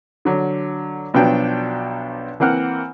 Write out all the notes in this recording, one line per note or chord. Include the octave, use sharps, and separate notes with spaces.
D3 F#3
B1 B2 F3 F#3 D4 G5
E3 A#3 C4 F#5 F6 F#6